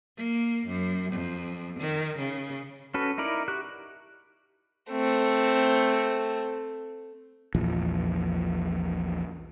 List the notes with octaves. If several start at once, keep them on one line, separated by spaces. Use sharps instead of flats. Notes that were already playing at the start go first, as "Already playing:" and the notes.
A#3
F#2
F2
D#3
C#3
C#4 F#4 A4 B4
D#4 E4 A#4 D5
F#4 G4 F#6
A3 C4
A#1 E2 F3